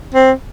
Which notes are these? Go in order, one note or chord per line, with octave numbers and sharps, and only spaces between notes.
C4